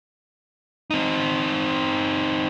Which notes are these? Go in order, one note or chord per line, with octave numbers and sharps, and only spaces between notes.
C4 D#4